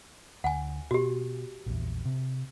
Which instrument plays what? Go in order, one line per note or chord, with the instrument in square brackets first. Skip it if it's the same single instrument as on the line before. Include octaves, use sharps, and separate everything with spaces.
[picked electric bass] D2 [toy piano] F#5 G#5
[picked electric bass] B2 [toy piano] F#4 G4
[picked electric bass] A#1 E2
C3